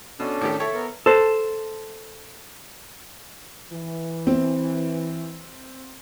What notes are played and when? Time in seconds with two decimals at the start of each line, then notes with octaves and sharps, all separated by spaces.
0.20 B2 C#4 D4 A4
0.41 A2 D#3 G4
0.60 E4 A4 C#5
0.74 B3 A#4
1.06 A4 C5
3.71 E3
4.27 C4